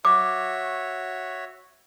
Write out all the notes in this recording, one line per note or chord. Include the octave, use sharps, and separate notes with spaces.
F#4 C#5 E5 D6